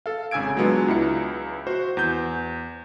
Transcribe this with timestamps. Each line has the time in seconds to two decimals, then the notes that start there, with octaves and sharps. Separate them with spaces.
0.06 A4 F5
0.31 G#1 C#3 G#5 E6 G#6 D7
0.57 F#3 G#3 B3 D4 F4
0.88 C#2 E4 C#7
1.67 F#4 C5
1.97 E2 G6